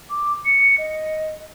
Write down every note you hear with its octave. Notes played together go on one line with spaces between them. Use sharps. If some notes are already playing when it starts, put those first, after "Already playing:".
D6
C#7
D#5